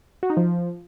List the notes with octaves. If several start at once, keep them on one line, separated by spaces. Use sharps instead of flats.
F#4
D#4
F3